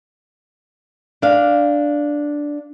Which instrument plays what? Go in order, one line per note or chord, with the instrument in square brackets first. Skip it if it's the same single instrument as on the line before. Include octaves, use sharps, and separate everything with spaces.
[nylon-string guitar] D4 F5